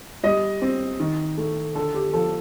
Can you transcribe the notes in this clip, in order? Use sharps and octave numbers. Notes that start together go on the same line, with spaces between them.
G3 D#5
C4
D#3
A3
D3 A4
G4
F3 A4